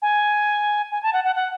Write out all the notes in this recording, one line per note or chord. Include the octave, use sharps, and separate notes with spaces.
G#5
G#5
A5
F#5
F#5
F#5